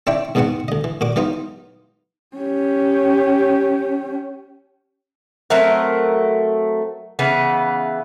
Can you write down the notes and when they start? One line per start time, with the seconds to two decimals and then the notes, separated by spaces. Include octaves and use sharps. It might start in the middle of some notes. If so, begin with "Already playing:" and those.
0.07 C4 D4 E4 C#5 E5 G5
0.35 E2 G#2 F3 B3 C4 F#5
0.68 D2 D#5
0.84 E3
1.01 A#2 F#4 D6
1.16 E3 F#3 B3 D#4 F4
2.37 C#4 G4
5.50 F#3 A3 C4 A#4
7.19 C#3 E3 B3